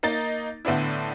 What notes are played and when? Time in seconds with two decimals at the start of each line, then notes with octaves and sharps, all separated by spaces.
0.03 A#3 D#4 A6
0.65 A2 D3 B3 D4 E4